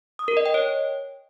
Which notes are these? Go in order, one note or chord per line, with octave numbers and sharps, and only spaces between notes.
D#6
A#4
D#5
G5
C#5